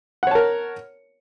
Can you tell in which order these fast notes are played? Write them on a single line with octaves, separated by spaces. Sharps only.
F#5 C#5 A5 A#4